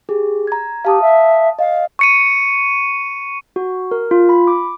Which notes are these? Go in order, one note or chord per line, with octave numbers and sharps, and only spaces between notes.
G4 G#4
A#5 G#6
G4 F5 A5 D#6
E5
D#5 F5
C#6 C#7 D#7
F#4
A#4
F4
B5
D6